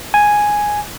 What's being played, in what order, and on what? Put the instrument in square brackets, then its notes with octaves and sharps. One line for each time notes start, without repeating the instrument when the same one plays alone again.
[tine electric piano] G#5